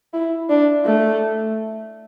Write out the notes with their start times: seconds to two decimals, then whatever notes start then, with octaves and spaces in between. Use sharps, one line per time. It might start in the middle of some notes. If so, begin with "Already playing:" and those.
0.14 E4
0.49 D4
0.84 A3